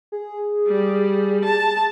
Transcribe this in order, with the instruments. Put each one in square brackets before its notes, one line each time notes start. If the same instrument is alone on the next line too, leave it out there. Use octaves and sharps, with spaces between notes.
[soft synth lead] G#4
[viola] G3
A5